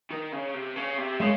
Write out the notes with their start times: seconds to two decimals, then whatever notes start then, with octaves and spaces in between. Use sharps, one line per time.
0.10 D#3
0.32 C#3
0.54 C3
0.76 C#3
0.98 C3
1.20 C#3 G#3